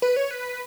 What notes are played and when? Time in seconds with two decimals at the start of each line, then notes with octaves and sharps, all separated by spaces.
0.02 B4
0.16 C#5
0.31 B4